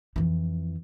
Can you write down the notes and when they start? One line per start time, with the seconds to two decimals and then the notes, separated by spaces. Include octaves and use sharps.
0.16 F2 E3